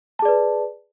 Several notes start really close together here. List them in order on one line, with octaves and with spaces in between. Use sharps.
A5 G#4 D5 B4